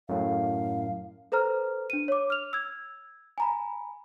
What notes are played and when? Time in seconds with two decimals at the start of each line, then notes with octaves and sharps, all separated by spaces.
0.09 F#2 A2 F5
1.32 A4 B4 C5 A#5 F6
1.90 D4 D#7
2.08 C#5 D6
2.30 F6 F7
2.53 E6 G#6
3.38 G#5 A#5 B5